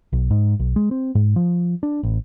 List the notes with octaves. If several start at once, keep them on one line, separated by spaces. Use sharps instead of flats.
B1
G#2
B1
G#3
C4
G#2
F3
D4
A1